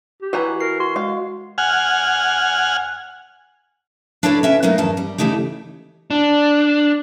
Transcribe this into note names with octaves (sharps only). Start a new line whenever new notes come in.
G4
E3 F#4 B4 A#5
A#4 C7
F#4 C6
G#3 F5
F#5 G#5 F6
D4 F#4 A4 B4 C#5 D5
C#4 E5 G5
F#3 A3 A#3 C#4 D#4
E2 G2 D#3 C#4 A5
G3
C#3 E3 A3 D#4 G4
D4